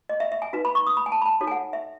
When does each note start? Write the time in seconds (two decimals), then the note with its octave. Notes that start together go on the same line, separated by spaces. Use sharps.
0.09 D#5
0.20 E5
0.32 E5
0.42 G#5
0.53 D#4 F#4 B4
0.65 B5
0.75 C#6
0.87 D#6
0.97 B5
1.06 G#5
1.12 A5
1.22 B5
1.26 A5
1.41 D#4 F#4 A4 C#5
1.47 G#5
1.52 F#5
1.73 E5